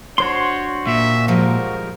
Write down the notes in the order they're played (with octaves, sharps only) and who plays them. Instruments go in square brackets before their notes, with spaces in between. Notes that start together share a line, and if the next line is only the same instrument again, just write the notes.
[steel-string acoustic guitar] D4 [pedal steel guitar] F#4 C5 C6 [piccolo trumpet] C#5
[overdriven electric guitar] A#2 [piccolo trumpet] E5
[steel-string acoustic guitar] F3 G3 G#3 [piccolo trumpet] A#4